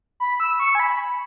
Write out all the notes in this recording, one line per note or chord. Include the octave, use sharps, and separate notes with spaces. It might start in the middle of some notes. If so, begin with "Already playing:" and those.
B5
E6
C#6
G#5
B5